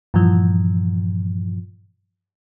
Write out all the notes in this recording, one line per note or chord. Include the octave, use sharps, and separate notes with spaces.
G2 A#2 E3 F3